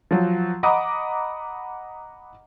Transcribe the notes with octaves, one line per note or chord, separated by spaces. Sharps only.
F3 F#3
D#5 F#5 A#5 B5 D6 D#6